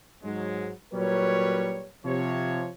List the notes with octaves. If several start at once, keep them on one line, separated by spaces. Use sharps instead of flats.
G#2 F#3 G#3
A#2 F#3 G3 A#4 B4 C#5
C3 F3 C#5